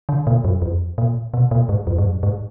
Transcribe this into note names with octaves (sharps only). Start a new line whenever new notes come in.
D3
A#2
F#2
F2
A#2
B2
A#2
G#2
F2
G#2
F#2
G#2